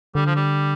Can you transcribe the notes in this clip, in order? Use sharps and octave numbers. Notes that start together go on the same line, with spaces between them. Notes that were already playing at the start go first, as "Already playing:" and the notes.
D3 G3
F3
G3